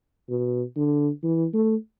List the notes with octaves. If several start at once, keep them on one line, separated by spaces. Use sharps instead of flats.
B2
D3
E3
A3